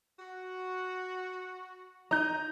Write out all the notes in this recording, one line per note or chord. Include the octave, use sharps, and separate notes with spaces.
F#4
D#4 D#5 A#5 G6